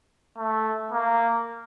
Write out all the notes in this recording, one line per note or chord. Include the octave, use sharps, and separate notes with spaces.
A3
A#3